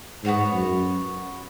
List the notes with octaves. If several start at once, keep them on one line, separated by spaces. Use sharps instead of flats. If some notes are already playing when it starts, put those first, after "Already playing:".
G#2 B3 F#4 C#5
F#2